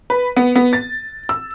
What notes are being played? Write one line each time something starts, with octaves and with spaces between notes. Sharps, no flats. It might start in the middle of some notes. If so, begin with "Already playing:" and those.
B4
B3
B3
A6
E6